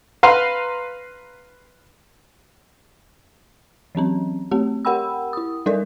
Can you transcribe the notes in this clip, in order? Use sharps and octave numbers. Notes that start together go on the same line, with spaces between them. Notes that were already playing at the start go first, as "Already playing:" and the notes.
B4 F5 A#5 C6
E3 F#3 C4 C#4
A3 C4 G4
G4 A#4 F#5 G5 B5 E6
E4 D#6
G3 D#4 A4 A#4 D5